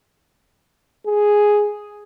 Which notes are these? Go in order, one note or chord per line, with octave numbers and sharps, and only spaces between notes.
G#4